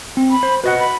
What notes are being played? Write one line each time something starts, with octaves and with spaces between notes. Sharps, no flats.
C4
B5
C5
F#4 B4 D#5 F#5
B5